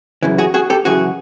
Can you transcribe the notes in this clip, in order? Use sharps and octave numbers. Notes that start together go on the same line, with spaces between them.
F#2 C#3 E3
F#4 G#4
F#4 G#4
G4 A4
F#2 C#3 E3 F#4 G#4